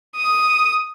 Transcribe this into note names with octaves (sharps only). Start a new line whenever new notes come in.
D#6